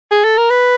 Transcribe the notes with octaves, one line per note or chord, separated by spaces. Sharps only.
G#4
A4
A#4
B4